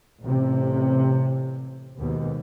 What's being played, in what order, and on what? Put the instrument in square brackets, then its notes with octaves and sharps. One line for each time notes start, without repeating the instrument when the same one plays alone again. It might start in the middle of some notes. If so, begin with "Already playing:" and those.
[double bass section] A1 C3
D#2 G#2 B2